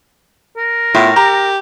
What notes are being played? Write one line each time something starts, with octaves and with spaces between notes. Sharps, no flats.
A#4
A2 B3 F4 E5
G4 A#5